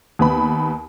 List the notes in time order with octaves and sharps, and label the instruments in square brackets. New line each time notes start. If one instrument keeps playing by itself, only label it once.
[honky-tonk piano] D#2 B3 B5